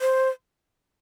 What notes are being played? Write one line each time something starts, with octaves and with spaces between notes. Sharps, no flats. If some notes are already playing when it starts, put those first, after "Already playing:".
C5